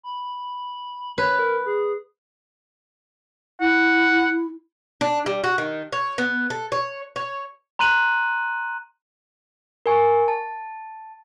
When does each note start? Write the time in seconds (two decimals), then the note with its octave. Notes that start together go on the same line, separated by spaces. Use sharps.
0.03 B5
1.18 B4 C#5
1.39 A#4
1.66 G#4
3.61 E4 F#5
5.01 D4
5.26 G3
5.44 F#4
5.58 D#3
5.93 C#5
6.18 B3
6.50 A4
6.72 C#5
7.16 C#5
7.79 A#5 C6 F#6 D#7 F#7
9.86 A#4 G#5 C#6
10.28 A5